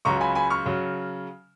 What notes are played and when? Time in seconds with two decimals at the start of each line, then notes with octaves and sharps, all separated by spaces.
0.05 C#2 C#3 F#3 A#5 C#6
0.21 G#5 B5
0.35 G#5 B5
0.50 C#6 F6
0.65 C#3 F#3